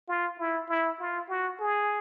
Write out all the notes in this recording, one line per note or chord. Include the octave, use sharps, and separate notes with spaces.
F4
E4
E4
F4
F#4
G#4